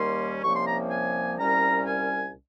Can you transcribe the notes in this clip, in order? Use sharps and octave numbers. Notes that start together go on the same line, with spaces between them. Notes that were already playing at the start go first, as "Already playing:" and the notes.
Already playing: D#2 D#3 G3 A#3 C#4 C6
C2 C3 F3 A#3 C#4 C#6
C6
A#5
G#5
C2 A#2 G3 C#4 A#5
G#5